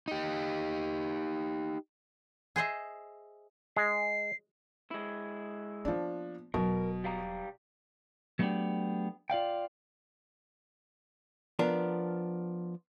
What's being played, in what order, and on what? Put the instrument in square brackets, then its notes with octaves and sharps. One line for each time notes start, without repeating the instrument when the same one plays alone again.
[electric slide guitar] D#4 G4
[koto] G#4 C5 D#5 E5
[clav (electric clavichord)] G#3 [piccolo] C7
[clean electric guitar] G#3 E4
[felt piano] F3 D4 [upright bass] A#3 B3
[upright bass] E1 F#3 [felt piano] B2 [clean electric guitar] A#4
[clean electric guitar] G3 F5 A#5
F#3 A3 B3 C4 D4 G4
F4 D5 F5 G5
[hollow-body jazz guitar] F3 B3 D4 A#4